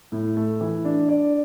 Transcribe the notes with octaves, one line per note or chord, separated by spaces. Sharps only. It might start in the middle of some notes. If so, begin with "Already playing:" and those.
A2
A3
E3
D4
D5